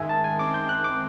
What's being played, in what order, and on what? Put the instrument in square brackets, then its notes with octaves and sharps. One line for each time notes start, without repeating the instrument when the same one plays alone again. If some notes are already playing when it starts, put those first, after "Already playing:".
Already playing: [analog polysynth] G#2 D#3 G#3 [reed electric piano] E5 G#5
[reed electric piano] A5
G#5
[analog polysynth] D#3 G#3 C4 [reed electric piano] D6
[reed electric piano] G6
F#6
D6